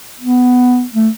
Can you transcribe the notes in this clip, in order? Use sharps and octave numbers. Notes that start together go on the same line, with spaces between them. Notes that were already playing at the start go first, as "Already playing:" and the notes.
B3
A3